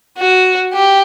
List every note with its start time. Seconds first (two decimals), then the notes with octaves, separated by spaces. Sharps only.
0.18 F#4
0.73 G4